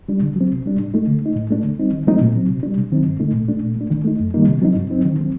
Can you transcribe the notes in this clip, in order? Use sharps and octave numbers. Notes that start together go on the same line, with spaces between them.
G3 D4
D3
F#3 C4
C3
G3 D4
A2
A3 D#4
D3
A3 D#4
A2
A3 D4
D3
G3 C4 D#4
D#3
F#3 A3 C4 D#4
A#2
F#3 C4
C3
G3 D4
C3
D#3 F#3 C4 D#4
G2
D3 A3 D#4
A#2
A3 D4
A#2
A3 D4
D#3
A3 D#4
F#2
D#3 G3 A#3 D#4
C3
F#3 C4 D#4
G2
F#3 C4 D#4
D#3
F#3 C4